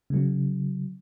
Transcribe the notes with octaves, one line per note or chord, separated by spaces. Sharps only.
C#3 F#3